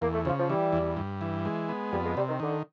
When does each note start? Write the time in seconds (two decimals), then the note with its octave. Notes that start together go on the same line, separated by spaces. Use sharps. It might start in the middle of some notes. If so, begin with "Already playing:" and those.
0.01 E2 A#3
0.13 A3
0.25 C#3 F3
0.38 F3
0.49 E3 G3
0.72 E2
0.97 G2
1.21 E3
1.45 G#3
1.69 B3
1.92 F2 G3
2.05 G#3
2.17 C3 G3
2.29 D#3
2.40 D3 D#3